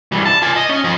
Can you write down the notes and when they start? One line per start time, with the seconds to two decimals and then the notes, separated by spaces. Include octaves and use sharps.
0.12 E3 G3
0.26 A5
0.42 F4 G#5
0.56 D#5
0.69 C#4
0.84 F3 D#5